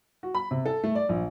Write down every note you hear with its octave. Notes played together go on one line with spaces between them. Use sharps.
F#4
B5
C3
A4
A3
D5
A#1